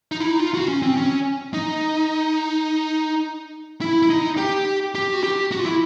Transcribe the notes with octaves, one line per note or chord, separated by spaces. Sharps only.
D#4
E4
D#4
F4
F#4
C#4
C4
C#4
D#4
E4
E4
D#4
G4
G4
F#4
G4
F#4
F4
E4